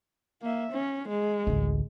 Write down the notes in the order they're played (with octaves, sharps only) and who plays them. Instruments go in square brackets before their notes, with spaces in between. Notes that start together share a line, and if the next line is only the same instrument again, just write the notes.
[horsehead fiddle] A#3 E5
C#4
G#3
[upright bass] A1 D2